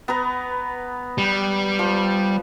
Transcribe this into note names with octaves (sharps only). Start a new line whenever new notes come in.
B3 B4 A#5
G3
F3